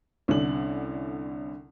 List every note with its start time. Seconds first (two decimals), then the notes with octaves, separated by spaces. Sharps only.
0.28 C2 D3 C#4 D4 F#7